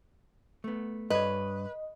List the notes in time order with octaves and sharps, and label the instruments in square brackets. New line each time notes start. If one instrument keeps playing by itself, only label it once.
[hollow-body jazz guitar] A3 B3
[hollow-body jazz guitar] G2 C#5 [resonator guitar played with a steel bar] B4 [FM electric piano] D#5